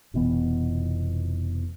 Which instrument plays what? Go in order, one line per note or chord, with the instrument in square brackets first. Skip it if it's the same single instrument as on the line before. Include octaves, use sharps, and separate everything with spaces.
[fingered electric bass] F1 B2 E3 B3